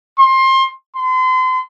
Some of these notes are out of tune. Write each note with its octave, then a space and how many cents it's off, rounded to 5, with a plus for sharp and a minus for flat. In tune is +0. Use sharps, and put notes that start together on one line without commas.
C6 +25
C6 -35